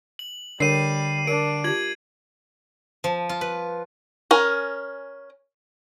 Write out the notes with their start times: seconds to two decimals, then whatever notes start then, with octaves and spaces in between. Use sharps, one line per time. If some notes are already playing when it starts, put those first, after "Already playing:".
0.19 F#7
0.60 D3 G3 A#4 C#5 G5 C7 D#7
1.27 D4 A#4 D7
1.64 F4 G4 G#6 F#7
3.04 F3
3.29 F4
3.41 B4
4.31 C#4 A#4 G#5